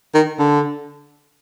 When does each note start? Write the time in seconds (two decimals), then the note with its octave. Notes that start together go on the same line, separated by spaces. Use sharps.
0.14 D#3
0.39 D3